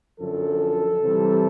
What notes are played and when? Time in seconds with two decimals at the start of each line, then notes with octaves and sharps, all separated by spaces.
0.19 F#2 D3 F3 A4
1.03 C3 E3 G3